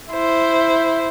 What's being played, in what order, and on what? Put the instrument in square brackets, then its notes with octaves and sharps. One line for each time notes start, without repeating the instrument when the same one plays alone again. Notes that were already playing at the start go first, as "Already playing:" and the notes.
[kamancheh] E4 C5